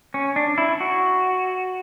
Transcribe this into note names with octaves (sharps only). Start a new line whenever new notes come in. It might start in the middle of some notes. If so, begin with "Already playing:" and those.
C#4
D4
E4
F#4